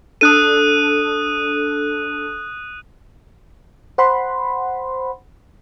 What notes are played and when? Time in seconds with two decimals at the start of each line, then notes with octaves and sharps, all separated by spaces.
0.21 D4 A4 D#6 F#6 D#7
3.98 C5 F#5 B5 C6